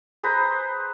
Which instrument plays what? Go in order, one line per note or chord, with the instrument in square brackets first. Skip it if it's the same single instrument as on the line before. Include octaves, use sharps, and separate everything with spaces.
[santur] G#4 B4 C5 A#5